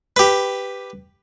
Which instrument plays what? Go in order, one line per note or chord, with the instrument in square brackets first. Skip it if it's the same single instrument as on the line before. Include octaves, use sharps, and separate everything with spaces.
[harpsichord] G4 B4